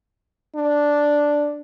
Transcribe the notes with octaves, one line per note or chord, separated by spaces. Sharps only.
D4